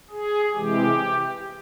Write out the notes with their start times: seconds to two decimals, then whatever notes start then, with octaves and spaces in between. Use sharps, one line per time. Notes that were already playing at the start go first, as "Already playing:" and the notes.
0.10 G#4
0.54 C3 E3 G#3 G4